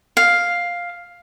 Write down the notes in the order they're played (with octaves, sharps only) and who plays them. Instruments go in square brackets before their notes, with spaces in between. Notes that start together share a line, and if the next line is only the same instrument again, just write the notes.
[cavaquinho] F5